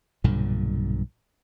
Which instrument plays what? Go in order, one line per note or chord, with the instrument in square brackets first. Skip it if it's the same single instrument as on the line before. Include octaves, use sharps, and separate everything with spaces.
[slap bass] B1 G2 A#2 D3